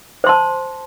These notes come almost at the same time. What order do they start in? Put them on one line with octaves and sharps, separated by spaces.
C5 C6 A5